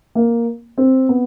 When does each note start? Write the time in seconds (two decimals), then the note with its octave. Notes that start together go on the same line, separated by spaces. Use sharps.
0.15 A#3
0.78 C4
1.09 B3